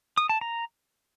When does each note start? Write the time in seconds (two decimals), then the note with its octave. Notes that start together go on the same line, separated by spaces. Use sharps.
0.18 D#6
0.29 A5
0.41 A#5